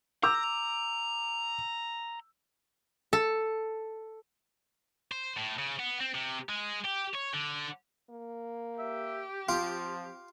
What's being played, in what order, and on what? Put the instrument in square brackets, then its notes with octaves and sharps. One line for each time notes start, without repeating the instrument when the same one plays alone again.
[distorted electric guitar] A#5 [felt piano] D6 E6 G6
[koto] A4
[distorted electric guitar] C5
A2
C#3
B3
C4
C3
G#3
G4
C#5
D3
[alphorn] A#3
[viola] G4 [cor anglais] E5
[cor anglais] F3 [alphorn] C4 [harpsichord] F4